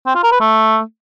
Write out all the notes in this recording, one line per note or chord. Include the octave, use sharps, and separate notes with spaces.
C4
F4
A#4
B4
A3